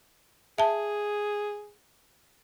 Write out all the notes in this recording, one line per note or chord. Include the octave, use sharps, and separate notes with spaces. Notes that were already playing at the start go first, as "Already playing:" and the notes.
G#4 E5 A5